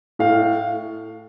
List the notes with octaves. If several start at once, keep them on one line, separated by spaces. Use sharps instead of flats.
A2 F5